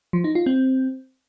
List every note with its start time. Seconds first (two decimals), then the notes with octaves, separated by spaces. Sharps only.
0.13 F3
0.24 D#4
0.35 F4
0.46 C4